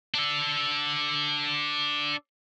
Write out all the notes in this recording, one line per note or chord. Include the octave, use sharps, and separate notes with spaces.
D4 A4